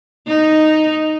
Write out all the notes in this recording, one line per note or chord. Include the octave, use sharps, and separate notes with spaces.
D#4